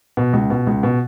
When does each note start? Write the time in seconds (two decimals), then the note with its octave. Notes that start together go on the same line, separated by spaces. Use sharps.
0.17 B2
0.33 C#2
0.50 B2
0.67 C#2
0.83 B2